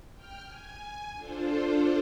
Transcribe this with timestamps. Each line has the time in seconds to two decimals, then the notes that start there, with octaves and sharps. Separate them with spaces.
0.14 G5 F6
0.46 G#5
1.16 D4 F4 A4 C5